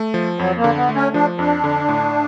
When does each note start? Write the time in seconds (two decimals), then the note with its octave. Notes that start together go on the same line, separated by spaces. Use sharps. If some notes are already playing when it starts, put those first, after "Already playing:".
Already playing: A3
0.14 F3
0.39 F2 F#3
0.57 A#3
0.64 D3
0.76 B3
0.89 A3
0.95 C#4
1.14 F3 D4
1.38 F2 D4
1.64 D3
1.88 A2